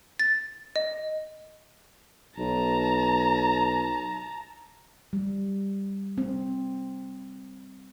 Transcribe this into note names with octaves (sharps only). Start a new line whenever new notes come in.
A6
D#5
B1 A5 A#5
G3
C4